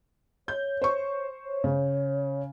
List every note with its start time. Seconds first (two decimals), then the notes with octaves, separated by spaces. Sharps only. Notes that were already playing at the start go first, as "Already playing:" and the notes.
0.48 C#5 G6
0.82 C5 C#6
1.44 C#5
1.64 C#3